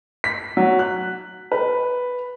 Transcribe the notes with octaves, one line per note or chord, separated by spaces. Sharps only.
B6
F#3
F#6
B4